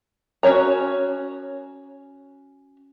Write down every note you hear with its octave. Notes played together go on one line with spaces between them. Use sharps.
C#4 F#4 C#5 A#5